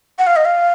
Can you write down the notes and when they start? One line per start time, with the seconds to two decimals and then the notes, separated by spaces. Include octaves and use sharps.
0.19 F#5
0.27 F5
0.36 D#5
0.45 F5